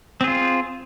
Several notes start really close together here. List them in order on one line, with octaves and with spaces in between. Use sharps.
C4 G#4 F4